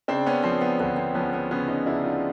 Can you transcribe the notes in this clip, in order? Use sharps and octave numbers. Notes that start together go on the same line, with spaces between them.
C#3 C4 D4
B3 C#4
F3 C4
B3
D2 B3
C4
F3 B3 C#4
B3
C#3 B3 C#4
C#4 D#4
C#3 D4 E4
D#4 F4